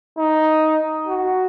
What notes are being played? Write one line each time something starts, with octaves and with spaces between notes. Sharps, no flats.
D#4
F#4